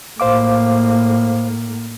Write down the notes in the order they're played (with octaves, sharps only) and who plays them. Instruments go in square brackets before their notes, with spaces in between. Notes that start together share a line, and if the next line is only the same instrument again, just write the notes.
[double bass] A2 A#3 [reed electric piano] C5 F5 D6